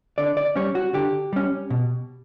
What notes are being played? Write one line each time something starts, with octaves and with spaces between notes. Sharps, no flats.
D3 D5
D5
G3 C#4 C#5
F#4
D3 G4
G3 C#4
B2